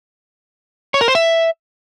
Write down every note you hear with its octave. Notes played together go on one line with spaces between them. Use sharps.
C#5
A#4
C5
E5